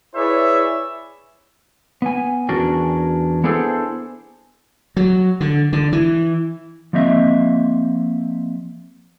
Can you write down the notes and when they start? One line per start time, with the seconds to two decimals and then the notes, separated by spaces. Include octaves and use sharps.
0.15 E4 G#4 B4 C#5 D5 E5
2.02 B3 G#5
2.49 E2 C#4 D4 F#4 G#4 A#4
3.44 B3 D4 E4 G#4 A4 C5
4.97 F#3
5.40 D3
5.73 D3
5.92 E3
6.93 F3 A#3 C4 D#5 E5